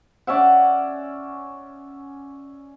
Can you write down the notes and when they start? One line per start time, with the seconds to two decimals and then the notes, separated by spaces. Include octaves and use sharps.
0.27 C#4 D5 E5 F#5